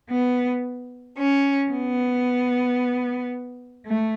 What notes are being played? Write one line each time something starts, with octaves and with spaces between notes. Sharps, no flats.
B3
C#4
B3
A3